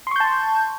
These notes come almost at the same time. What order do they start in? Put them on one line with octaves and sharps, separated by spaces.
C6 C#6 G6 A5